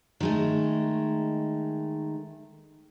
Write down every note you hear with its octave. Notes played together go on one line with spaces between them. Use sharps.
D#3 G#3 A3